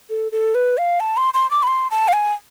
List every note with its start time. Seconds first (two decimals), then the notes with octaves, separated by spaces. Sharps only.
0.10 A4
0.32 A4
0.55 B4
0.78 F5
1.00 A5
1.17 C6
1.34 C6
1.51 D6
1.63 B5
1.67 C6
1.91 A5
2.08 F5
2.13 G#5